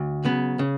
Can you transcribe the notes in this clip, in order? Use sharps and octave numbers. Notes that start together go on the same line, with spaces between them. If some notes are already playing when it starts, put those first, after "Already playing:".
Already playing: D2
C#3 F#3 B3
C#3